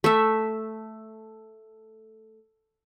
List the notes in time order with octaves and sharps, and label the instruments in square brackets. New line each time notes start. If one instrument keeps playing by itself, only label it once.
[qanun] A3 E5